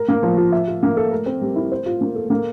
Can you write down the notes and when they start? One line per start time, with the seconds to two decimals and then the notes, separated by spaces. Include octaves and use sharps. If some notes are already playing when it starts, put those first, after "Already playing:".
Already playing: A#4
0.08 A#3
0.23 F3
0.37 F4
0.52 E5
0.67 F4
0.83 A#3
0.97 A4
1.11 A#4
1.26 C4
1.41 G3
1.56 E4
1.72 C5
1.86 F4
2.01 A#3
2.16 A4
2.30 A#3